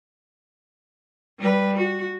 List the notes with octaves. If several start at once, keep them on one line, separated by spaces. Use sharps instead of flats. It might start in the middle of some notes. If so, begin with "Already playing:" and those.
G3 B4
F#4